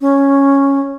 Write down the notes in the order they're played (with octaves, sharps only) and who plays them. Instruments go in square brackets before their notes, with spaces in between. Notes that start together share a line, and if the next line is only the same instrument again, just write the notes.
[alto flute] C#4